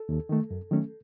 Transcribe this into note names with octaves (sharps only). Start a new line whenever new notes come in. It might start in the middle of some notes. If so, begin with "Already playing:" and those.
Already playing: A4
D#2
D#3 A3
F#2
D#3 F#3 A3 C#4